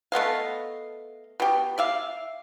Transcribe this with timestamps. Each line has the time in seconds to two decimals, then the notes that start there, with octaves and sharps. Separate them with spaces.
0.12 A3 B3 D#5 F5
1.40 B2 G4
1.78 D5 E5 F5